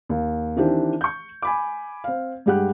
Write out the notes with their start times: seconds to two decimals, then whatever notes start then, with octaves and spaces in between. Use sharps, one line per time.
0.09 D#2
0.57 D#3 E3 C4 D4 G4
1.01 C#6 G6
1.42 G#5 B5 D6
2.04 C4 F5
2.46 G2 G#3 G4 F#5 F#6